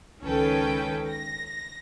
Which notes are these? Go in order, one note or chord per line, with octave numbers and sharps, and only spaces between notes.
C#2 D#3 C#4 A4 B4 G5
A#6